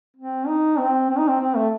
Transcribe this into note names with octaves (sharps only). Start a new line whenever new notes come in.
C4
D#4
C4
C4
D#4
C4
C4
A3